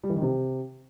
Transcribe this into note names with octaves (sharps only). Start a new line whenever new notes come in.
G3
E3
D#3
C3